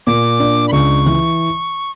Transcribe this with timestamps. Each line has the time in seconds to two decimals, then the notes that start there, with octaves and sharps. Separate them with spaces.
0.07 A#2 D6
0.40 D4
0.68 B5
0.72 C#2 C#6
1.06 E3